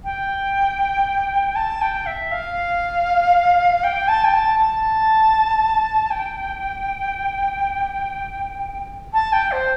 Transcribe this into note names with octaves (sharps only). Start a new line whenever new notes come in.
G5
A5
G5
E5
F5
G5
A5
G5
A5
A5
G5
A5
G5
C5